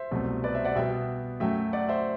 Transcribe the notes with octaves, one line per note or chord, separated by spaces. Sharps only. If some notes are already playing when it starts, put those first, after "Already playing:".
Already playing: C5 E5
C2 B2 F#3 A3
B4 D5
C5 E5
D5 F#5
B2 G3 B3 E5 G5
F#2 F#3 A3 E5 G5
D5 F#5
C5 E5